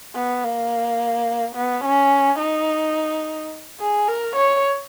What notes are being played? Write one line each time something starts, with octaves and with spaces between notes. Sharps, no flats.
B3
A#3
B3
C#4
D#4
G#4
A#4
C#5